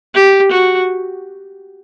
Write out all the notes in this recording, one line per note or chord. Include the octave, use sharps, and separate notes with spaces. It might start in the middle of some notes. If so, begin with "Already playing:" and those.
G4
F#4